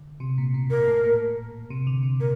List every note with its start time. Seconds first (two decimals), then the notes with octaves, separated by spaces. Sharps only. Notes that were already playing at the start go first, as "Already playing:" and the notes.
Already playing: D3
0.20 C3
0.38 A#2
0.54 A#2
0.70 A#2 A#4
0.88 A2
1.04 A#2
1.70 C3
1.87 D3
2.03 C3
2.20 A#2 A#4